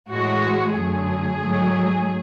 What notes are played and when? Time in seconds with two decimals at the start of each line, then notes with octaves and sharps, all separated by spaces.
0.09 A2 E3 G#3 F#4
0.75 F#2 D3 F#3 A3 G#4
1.40 G#2 F#3 A3